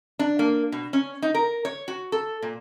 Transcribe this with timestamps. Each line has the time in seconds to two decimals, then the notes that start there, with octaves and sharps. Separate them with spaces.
0.19 D4
0.39 A#3
0.72 B2
0.93 C#4
1.22 D#4
1.34 A#4
1.65 C#5
1.88 F#4
2.12 A4
2.42 A#2